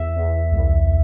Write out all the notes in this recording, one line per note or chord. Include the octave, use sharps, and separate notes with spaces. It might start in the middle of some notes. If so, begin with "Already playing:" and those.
Already playing: E2 E5
E2
C2